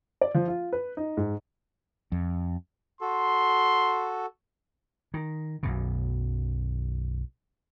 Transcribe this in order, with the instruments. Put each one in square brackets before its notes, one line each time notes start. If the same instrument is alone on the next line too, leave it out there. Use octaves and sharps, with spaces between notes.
[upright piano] D5
F3
F4
B4
D#4
G#2
[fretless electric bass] F2
[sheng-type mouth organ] F#4 A4 [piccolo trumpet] C6
[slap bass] D#3
B1 F#2 B2